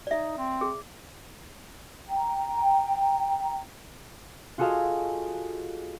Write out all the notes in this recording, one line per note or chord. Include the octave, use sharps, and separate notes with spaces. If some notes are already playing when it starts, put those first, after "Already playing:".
D#4 D5 E5
C4
G#4
G5 A#5
F4 F#4 G#4 A4 D#5 F5